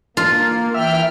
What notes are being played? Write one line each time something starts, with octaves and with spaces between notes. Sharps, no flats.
A#3 F4
E3 E5 G5 F6